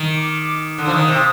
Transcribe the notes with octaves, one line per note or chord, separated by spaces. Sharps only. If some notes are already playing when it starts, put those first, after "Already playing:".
Already playing: D#3
D6
D3 D#6
F3
D#3
C3